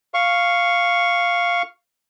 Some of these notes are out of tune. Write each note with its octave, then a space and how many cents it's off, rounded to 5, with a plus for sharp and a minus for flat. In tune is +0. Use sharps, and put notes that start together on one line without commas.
F5 +0 C#6 +0